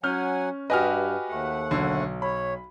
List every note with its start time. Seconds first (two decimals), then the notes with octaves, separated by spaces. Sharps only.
0.03 F#3 C#4 F#5 G#5 F6 G6
0.70 G2 F#4 G4 B4 D#5 G#5 F6
1.29 D#2 A3 F#5
1.71 B1 D3
2.22 C#5 B5